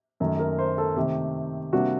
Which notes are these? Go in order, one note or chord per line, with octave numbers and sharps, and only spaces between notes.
F#2 D#3 A3
A#4
C5
A4
C3 D#3 A3 G4
C3 G3 A#3 D4 F#4